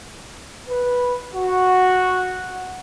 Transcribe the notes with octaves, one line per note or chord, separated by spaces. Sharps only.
B4
F#4